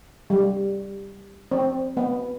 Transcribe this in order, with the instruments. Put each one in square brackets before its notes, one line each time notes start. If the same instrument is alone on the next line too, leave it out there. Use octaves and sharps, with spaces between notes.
[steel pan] G3
C4
B3